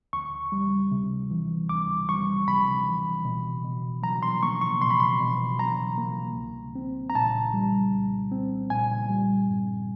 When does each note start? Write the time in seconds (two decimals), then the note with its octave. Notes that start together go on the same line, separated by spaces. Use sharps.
0.13 D2 C#6
0.52 G3
0.92 C3
1.31 E3
1.69 D2 D6
2.08 G3 C#6
2.47 C3 B5
2.87 E3
3.25 B2
3.65 B2
4.02 F#3 A#5
4.23 C6
4.43 A#3 C#6
4.61 C#6
4.81 B2 C6
4.90 B5
5.00 C6
5.20 B2
5.59 F#3 A#5
5.98 A#3
6.36 C2
6.75 C4
7.10 A#5
7.15 A#2 A5
7.54 G3
7.93 C2
8.31 C4
8.70 A#2 G#5
9.09 G3
9.49 G2